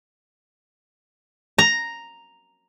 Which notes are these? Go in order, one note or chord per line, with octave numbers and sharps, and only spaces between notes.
A#5